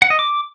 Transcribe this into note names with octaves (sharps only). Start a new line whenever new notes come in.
F#5
D#5
D6